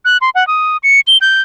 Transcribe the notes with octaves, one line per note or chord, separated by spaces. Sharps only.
F#6
C6
F#5
D#6
C#7
G7
G6